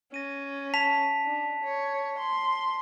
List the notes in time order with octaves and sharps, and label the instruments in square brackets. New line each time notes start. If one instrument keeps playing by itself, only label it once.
[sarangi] C#4 [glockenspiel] A#6 D#7
[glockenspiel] A5 B6 F7
[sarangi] D4
C#5
C6